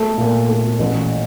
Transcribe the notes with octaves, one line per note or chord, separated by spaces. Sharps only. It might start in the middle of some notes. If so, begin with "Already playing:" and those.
Already playing: A3
A#2
A3
A1